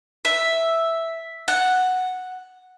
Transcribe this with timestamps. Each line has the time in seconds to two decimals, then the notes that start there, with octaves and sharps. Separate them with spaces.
0.25 E5
1.48 F#5